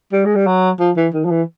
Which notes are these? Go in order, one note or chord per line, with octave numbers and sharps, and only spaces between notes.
G3
G#3
G3
F#3
F3
E3
D#3
F3
E3